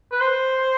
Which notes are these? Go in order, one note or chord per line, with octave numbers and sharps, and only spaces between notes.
B4
C5